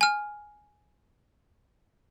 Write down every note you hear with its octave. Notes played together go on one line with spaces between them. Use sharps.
G#5 F6